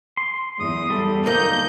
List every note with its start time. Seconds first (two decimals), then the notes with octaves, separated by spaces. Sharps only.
0.17 C6
0.59 E2 D#6
0.90 G3 A4
1.26 D2 A#3 D#4 A#5 G6